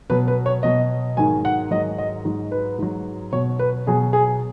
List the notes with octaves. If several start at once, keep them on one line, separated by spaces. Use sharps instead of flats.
B2 F#3 B4
B4
C#5
B2 F#3 D#5
G#2 D#3 F#3 G#5
F#5
G#2 D#3 F#3 D#5
D#5
G#2 F#3
B4
G#2 F#3
B2 F#3 C#5
B4
B2 F#3 G#4
G#4